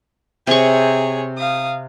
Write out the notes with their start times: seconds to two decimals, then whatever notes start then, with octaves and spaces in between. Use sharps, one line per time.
0.47 C3 G#4 C#5 C#6
1.38 F5 D#6